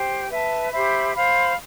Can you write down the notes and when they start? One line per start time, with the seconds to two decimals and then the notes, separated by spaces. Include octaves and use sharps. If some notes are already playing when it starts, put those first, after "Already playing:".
Already playing: G4 C5 G5
0.29 B4 E5 A5
0.71 G4 C5 E5 B5
1.14 C5 F5 B5